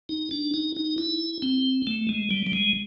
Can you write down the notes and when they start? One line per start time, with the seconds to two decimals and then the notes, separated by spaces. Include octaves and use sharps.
0.09 D#4
0.31 D4
0.54 D#4
0.76 D#4
0.98 E4
1.42 C4
1.87 A3
2.09 G#3
2.31 G3
2.47 G3
2.53 G#3